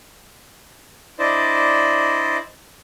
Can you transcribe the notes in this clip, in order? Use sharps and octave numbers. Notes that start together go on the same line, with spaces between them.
D4 E4 C5 D5 D#5